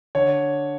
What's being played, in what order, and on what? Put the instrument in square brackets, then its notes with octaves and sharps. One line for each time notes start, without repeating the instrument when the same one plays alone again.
[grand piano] D3 C#5